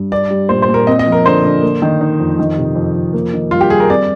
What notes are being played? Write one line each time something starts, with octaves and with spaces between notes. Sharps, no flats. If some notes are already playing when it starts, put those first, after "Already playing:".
Already playing: G2
D4 D5
G3
A#2 C5
C5
A#2
A#4
C4 D#5
D#5
F3
A#4
D3 C5
D3
A#3
D#3
D#4
F2
D#3
C3
F2
F2
A#3
D#3
G2 F4
G4
G2 G#4
A#4
C4 D5